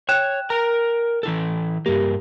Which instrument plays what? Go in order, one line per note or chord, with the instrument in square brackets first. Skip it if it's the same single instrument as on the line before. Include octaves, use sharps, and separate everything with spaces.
[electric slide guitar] C#5 [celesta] G5 F#6 E7
[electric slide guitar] A#4 A#5
E3 E4 A4
[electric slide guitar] G2 A#3 [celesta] G4